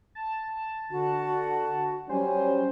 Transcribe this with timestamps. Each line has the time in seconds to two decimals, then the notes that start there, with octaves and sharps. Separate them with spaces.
0.15 A5
0.91 D3 F#4
2.09 F#3 G3 C#4 C5 G#5